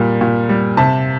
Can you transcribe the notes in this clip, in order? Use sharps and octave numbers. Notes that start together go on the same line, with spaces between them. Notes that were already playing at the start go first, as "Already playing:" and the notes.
Already playing: A#2 G3
A#2
G3
C3 A5